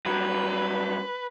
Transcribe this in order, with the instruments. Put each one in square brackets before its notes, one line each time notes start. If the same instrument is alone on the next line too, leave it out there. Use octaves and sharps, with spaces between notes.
[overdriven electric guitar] G2 F#3 [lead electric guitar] B4